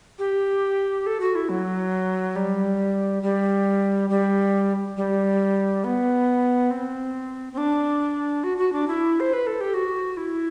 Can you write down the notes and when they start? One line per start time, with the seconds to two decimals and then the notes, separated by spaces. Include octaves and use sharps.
0.19 G4
1.06 A4
1.20 F#4
1.35 E4
1.49 F#3
2.36 G3
3.23 G3
4.10 G3
4.97 G3
5.84 B3
6.71 C4
7.53 C4
7.58 D4
8.44 F#4
8.58 F#4
8.73 D4
8.88 E4
9.20 C5
9.33 B4
9.47 A4
9.61 G4
9.74 F#4
10.17 E4